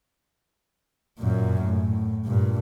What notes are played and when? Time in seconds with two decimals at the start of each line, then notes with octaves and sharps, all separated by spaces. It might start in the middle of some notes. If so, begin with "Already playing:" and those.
1.19 F#2 A#2
1.64 A2
2.25 G2 A#2